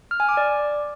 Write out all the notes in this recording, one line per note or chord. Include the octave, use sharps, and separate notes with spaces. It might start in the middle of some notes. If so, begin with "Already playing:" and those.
F6
G#5
D6
D5